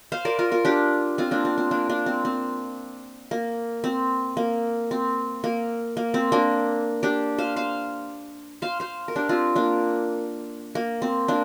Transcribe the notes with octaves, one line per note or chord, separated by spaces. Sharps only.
C5 F5
A#4 D5
F4 A#4
F4 A#4
D4 G4
C4 F4
A#3 D4
C4
C4
A#3 D4
A#3 D4
C4
C4
A#3
C4
A#3
C4
A#3
A#3
C4
A#3 D4
D4 G4
C5 F5
C5 F5
C5 F5
C5 F5
A#4
D4 G4
C4 F4
A#3 D4
A#3
C4
A#3 D4